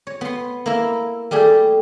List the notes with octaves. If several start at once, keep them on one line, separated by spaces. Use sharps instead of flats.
C#5
B3 C6
A#3 E4
G3 A3 G4 G#4